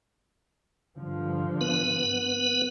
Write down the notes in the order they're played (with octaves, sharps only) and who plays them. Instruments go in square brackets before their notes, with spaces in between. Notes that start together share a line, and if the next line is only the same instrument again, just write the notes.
[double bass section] G2 D3 F3
[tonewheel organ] B3 B4